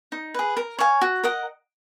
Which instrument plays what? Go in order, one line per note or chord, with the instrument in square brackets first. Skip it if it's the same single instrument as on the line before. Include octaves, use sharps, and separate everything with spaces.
[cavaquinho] D#4
G#4 B4
A#4
C#5 F5 G#5
F#4
A#4 D#5 F#5